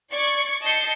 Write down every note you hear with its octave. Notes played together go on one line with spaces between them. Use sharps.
D5 C#6 G#6 C#7
D#5 A5 G6 C7 C#7